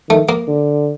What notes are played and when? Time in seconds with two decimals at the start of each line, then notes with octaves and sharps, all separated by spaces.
0.09 D#3 A3
0.29 A#3
0.47 D3